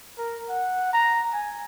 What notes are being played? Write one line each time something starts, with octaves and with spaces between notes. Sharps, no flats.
A#4
F#5
A#5
G#5